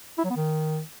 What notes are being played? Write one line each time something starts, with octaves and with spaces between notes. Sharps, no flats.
E4
F#3
B3
D#3